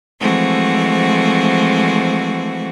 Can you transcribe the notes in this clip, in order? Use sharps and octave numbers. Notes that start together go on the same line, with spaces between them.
E3 F3 G#3 A3 C4 F#4